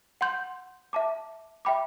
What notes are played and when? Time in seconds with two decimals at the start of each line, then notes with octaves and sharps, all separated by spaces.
0.21 F#5 C6 G6
0.93 E5 A5 D6
1.65 E5 G5 B5 D6